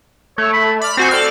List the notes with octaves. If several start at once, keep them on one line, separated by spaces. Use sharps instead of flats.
A3 C#5
B5
D5 B5 F6
C4 F#4 C5 G#5
A4 D5 F6